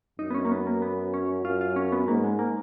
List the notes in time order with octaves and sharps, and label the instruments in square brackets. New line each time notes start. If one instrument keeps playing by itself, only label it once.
[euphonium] F#2 [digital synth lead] D#4
[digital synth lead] B3
C#4
A#3
B3
A#3
B3
C#4
[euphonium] F#2 [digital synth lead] F4
[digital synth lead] F4
C#4
B3
[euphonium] G#2 [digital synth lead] A#3
[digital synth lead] G#3
A#3